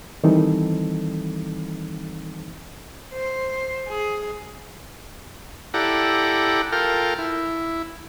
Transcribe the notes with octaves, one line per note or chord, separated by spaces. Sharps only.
D#3 E3 G3 C4 D#4 A4
C5
G#4
E4 G4 A4 D5 F#5 A#5
F4 A4 A#4 G5 F6
E4